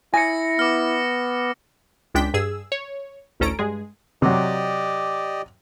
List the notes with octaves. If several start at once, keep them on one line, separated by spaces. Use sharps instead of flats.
E4 G#5 A#6 C#7
B3 D6 F6
C#2 G#3 D4 G5 B6
G2 G#4 E6
C#5
A1 D2 C#4 A4 A#5 D7
G2 G#3 G#4
C3 F#3 G4 D5 D#5